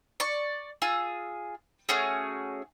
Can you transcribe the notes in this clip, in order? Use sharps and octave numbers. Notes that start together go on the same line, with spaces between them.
D5 C#6
F4 G#4 E6
A3 C#4 F#4 G#4